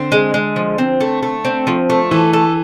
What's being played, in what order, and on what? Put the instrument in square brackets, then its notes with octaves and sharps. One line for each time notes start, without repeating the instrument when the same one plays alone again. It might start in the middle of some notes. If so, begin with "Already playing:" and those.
Already playing: [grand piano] D3 [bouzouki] C4
[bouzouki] G#3
G#3
F3
C4
A3
A3
C4
F3
A3
[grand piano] E3 [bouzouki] A4
[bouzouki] A4